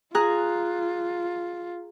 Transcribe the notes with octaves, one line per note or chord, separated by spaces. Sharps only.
F4 G#4 A#5 F#6